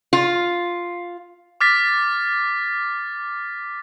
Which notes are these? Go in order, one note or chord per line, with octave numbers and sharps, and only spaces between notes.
F4
D6 F6 A6 B6